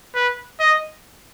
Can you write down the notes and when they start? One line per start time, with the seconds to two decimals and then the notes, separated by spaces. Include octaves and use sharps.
0.15 B4
0.60 D#5